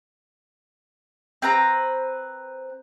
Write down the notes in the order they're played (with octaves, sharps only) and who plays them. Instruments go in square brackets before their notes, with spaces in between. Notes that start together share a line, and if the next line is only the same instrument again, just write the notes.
[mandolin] C4 B4 A#5